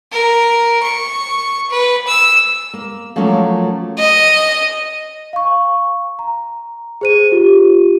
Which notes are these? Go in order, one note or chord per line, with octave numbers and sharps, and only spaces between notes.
A#4
C#6
B4
E6
A#3
F3 F#3 A3 A#3 C#4 A#4
D#5
F5 C#6
A#5
G#4 C5 D#7
F4 G4